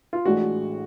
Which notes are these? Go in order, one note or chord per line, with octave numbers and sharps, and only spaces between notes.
F4
A1 A2 G#3 D4 F#4